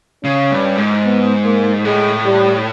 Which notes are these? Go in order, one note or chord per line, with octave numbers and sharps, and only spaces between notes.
C#3 C#4
G2
G#2
B3
A#3
A2 G#3
G3